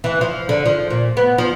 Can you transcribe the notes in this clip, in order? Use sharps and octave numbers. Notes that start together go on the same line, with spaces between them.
E3
F3
D3
F3
A#2
B3
F3